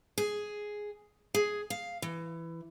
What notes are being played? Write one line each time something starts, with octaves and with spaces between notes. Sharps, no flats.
G#4
G#4
F5
E3